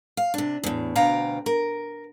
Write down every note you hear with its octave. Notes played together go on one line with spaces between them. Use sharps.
F5
C3 D4
E2 A2
D2 B2 F5 G5 A#5
A#4